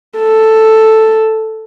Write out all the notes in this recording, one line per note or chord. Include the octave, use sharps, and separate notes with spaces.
A4